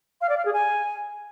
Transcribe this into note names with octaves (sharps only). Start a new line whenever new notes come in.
F5
D5
F5
G#4
G#5